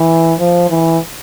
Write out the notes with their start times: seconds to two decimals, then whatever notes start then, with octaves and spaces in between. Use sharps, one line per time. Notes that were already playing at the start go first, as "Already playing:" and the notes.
Already playing: E3
0.39 F3
0.70 E3